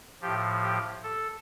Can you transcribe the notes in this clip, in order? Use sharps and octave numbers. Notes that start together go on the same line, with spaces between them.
A2 F3 G4
G4
A4